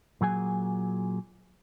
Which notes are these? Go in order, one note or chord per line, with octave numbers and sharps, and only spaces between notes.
A#2 F#3 G#4 G#5